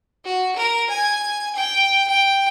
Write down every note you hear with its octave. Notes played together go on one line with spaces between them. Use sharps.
F#4
A#4
G#5
G5
G5